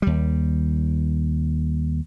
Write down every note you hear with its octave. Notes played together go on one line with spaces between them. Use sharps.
D#2 G3